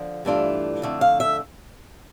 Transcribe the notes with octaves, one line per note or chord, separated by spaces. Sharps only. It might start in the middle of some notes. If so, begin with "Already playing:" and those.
Already playing: D3 F3
G2 E3 A3 D4 F4
F2 D3 A3
F5
E5